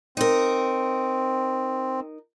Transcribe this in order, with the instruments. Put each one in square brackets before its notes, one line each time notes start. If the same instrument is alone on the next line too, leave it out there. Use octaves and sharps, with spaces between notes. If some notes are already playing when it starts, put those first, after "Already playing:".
[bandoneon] C4 [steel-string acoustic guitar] D#4 A#4